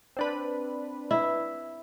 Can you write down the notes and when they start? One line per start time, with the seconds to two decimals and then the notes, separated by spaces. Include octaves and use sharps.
0.17 C4 D4 B4
1.11 E4